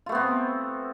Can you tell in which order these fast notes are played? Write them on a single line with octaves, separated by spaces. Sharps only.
F4 A3 B3 C4